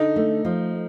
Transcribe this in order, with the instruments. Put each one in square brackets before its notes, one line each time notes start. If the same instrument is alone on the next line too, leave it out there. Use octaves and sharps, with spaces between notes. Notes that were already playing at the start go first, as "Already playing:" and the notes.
Already playing: [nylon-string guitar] D3 [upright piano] D#4
[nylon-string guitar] A3
F3